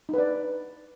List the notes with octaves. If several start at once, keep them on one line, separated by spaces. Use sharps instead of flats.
D#4 B4 D5